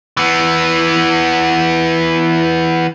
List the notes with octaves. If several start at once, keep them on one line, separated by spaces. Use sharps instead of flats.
E3 B3